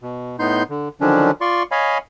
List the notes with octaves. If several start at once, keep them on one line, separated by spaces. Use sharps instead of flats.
B2
A2 B3 D#4 C6 G6
D3
D3 D#3 F3 F#3 C#4 D4
F4 D5 C6 C#6
C#5 D#5 F5 G#5 B5